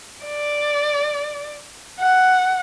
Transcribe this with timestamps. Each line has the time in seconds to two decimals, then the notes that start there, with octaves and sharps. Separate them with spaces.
0.25 D5
2.00 F#5